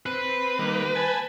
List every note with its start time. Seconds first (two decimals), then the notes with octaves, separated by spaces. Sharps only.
0.06 C4 B4
0.59 D#3 G3 A#3
0.95 G#5 A5 B5